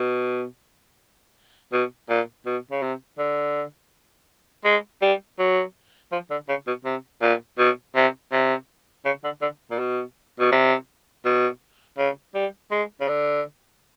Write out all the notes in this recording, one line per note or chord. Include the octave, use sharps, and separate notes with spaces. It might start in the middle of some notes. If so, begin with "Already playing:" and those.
Already playing: B2
B2
A#2
B2
C#3
C3
D3
G#3
G3
F#3
F3
D3
C#3
B2
C3
A#2
B2
C3
C3
C#3
D3
D3
A#2
B2
B2
C3
B2
C#3
G3
G#3
C#3
D3